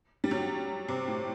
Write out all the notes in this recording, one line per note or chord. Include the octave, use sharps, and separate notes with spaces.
G3
F#3
C3
A2